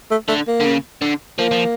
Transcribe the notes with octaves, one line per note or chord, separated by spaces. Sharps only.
A3
D3 A3
A#3
D3
C#3
D3
F3 A#3
F3